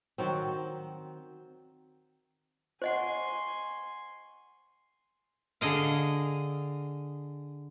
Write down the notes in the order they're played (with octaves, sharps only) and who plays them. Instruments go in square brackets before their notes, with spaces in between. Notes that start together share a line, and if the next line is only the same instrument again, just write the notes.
[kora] D#3 F#3 C4
[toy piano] C5 D#5 F#5 [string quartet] G#5 C6 C#6
[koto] D3 G#4 D#5 F5